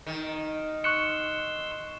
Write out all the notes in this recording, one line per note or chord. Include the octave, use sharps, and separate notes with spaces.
D#3
C6 C#6 E6 F#6 C#7